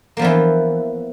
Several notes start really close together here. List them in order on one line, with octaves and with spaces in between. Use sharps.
A#3 F3 B3 E3